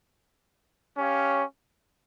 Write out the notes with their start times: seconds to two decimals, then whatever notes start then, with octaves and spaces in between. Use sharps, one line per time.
0.97 C#4 G4 C#5 F5